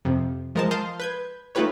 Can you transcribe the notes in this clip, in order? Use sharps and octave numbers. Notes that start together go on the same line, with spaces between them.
F2 C3
F3 G#3 A#4 D#5 A5
F5 A5 C6 D#6 F6 G6
B4 G6 G#6
A3 D#4 F4 G4 B4 C#5